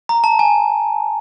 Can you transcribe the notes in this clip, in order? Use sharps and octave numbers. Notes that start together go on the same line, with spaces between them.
A#5
A5
G#5